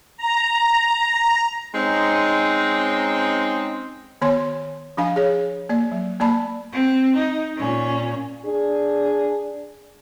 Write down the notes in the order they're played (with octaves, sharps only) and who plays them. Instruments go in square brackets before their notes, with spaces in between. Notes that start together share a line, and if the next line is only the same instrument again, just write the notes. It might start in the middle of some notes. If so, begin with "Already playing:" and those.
[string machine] A#5
[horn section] G#3 C4 C#4 D#4
[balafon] D#3 B3 C#5 G#5 C6
F3 D4 F5 G#5
G#4 C#5
A#3 D5
F#3
A#3 D5 A5 B5
[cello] C4
D#4
A#2 C#4
[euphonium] D4 [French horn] G#4